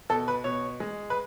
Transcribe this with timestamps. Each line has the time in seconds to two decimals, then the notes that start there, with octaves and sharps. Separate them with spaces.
0.09 B2 A4
0.28 B4
0.44 B2 C#5
0.80 G#3
1.10 B4